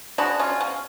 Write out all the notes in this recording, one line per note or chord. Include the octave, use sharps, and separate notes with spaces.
B2 G#3 B3 D4 F#4
C#4 F4
C#4